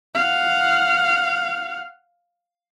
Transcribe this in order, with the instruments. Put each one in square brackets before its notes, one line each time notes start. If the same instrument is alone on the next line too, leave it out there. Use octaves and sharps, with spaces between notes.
[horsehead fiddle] F5 F#5